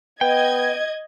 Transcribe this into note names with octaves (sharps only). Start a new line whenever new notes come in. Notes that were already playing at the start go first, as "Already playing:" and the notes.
B3 D#5 G5 G#6